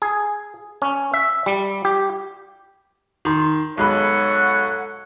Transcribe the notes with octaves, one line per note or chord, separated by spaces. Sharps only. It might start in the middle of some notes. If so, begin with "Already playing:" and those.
G#4
C#4
E5
G3
G4
D#3 C6
B1 G#3 A4 C#5 F#5 B5